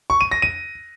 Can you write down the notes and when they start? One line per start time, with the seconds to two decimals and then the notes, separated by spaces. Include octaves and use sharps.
0.10 C#6
0.21 D#7
0.31 A#6
0.42 D#7